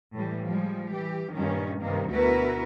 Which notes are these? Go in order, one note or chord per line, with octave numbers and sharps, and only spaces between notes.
A2 E3 G3
F3 G3 G#3
E3 G4
G2 A#2 D#3 G3 C#4
G2 C3 D#3 G3 A#3
D2 B2 E4 F#4 A#4 B4